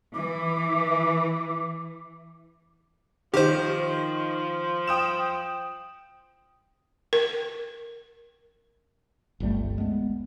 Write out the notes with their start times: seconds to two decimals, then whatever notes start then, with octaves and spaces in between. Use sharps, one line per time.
0.14 E3 D6
3.34 D#3 F3 G4 C5
4.87 G5 D#6 E7
7.13 A#4
9.40 G1 C#2 G3 A3
9.78 G#3 B3